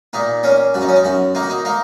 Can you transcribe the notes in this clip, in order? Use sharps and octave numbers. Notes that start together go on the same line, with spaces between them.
A#2 D#4
A#3 C#4
F#2 F#4
D#4
C#4
D#4
F#2 F#4
A#3 D#4
F#4
D#4
A#3 D#4